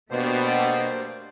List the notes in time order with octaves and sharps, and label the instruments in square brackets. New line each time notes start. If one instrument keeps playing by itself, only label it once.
[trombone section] B2 [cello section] A3 D4 G4 [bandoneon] A#3 C5